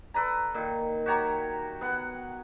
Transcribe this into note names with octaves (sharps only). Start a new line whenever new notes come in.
A4 B4 D5 A#5
A#2 D#3
F#4 G4 C#5 A#5
B3 F#5